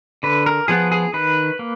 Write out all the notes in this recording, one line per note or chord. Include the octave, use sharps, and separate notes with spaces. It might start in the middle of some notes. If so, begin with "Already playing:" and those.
D3 B4
A#4
F3 B3 G#4
G#4
D#3 B4
A#3